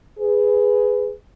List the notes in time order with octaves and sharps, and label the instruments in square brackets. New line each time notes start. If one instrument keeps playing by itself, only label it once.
[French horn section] G#4 B4